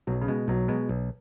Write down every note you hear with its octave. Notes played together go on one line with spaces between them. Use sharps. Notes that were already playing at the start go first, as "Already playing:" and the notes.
B1 F#3
C#3
B2 G#3
B1 F#3
B2 G#3
B1